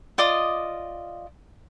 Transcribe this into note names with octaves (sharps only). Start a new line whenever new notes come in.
F4 D5 D#5 D#6